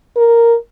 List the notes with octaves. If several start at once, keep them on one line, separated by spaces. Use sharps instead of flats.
A#4